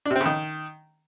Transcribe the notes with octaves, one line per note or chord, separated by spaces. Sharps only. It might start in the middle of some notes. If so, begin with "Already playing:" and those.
D4
C3
C4
C#3
D#3